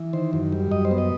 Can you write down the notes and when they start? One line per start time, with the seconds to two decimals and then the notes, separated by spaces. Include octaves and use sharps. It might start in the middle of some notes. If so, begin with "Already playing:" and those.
Already playing: E3
0.13 D#3 C5
0.33 F#2
0.52 G3
0.72 F#2 D#5
0.85 C5
0.91 B3
0.98 D#5